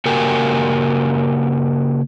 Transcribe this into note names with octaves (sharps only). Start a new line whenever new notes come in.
C#3 A#3 F#4 G4 A#4 G#5